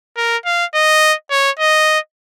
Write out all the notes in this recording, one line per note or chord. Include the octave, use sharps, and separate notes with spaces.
A#4
F5
D#5
C#5
D#5